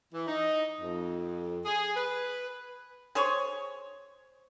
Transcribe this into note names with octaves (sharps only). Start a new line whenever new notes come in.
E3
D#4
F2
G#4
B4
G#4 C5 C#5